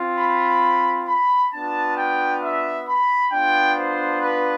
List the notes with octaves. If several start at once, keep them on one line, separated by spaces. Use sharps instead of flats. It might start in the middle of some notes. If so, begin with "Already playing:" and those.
Already playing: C4 F4
B5
B5
B3 D4 F4 A5
G5
E5
B5
B3 D4 F4 G5
C5
B4